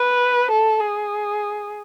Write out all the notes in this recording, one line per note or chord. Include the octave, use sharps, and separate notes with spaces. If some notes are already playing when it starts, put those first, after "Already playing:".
Already playing: B4
A4
G#4